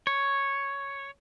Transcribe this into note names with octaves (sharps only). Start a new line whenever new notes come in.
C#5